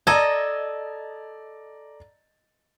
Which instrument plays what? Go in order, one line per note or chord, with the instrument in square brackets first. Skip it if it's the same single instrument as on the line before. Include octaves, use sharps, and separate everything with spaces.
[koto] A4 D#5 [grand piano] D5 A#5 G#6